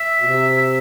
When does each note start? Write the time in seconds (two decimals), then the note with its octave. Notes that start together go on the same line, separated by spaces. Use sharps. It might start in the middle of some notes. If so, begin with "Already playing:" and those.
Already playing: E5
0.20 B2
0.25 C3
0.57 E5